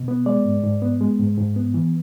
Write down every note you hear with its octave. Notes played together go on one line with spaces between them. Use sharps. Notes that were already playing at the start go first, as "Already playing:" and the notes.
Already playing: B2
B3
G#3 D5
G#2
G#2
B3
G#3
G#2
G#2
B3
E3